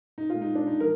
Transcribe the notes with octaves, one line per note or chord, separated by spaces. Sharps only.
D#4
A#2 F4
G#3
D#4
D4
D#4
F3 A#4